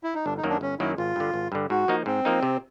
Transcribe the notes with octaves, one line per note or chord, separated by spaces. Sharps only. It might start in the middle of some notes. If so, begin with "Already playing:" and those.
E4
D#4
G1 D4
D#4
F#2 D#3 F#3 A#3
D4
G1 C#4
F#2 D#3 F#3 A#3 E4
G#1 F4
G2 D3
G#1
G2 D3
G#2 F#4
F3 A#3 D#4
G#2 C4
F3 A#3 D#4
C3